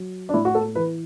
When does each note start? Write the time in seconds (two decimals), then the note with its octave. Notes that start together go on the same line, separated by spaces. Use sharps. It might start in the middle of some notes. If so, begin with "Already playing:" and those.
Already playing: F#3
0.29 D4
0.34 A2 E4
0.45 F#4
0.55 A4
0.75 E3 B4